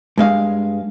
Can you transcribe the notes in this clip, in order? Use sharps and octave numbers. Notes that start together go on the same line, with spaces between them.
G2 G#3 F5